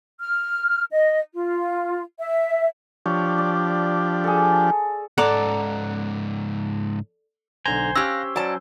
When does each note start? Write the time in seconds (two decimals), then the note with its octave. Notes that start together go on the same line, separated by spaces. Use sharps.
0.20 F6
0.91 D#5
1.35 F4
2.18 E5
3.06 F3 D4 G4 C#5
3.38 D5
4.24 G#4 A4
5.18 C#2 G#2 A4 D5 F#5 A#5 D6
7.65 B1 D3 C5 G#5 A#5
7.96 C#4 G4 F5 E6 F#6 A#6
8.36 F#3 C#4 D5 A5